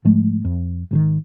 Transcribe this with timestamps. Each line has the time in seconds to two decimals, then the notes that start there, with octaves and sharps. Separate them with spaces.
0.05 G#2 F3 G#3 A3
0.45 F2
0.91 G#1 C3 D#3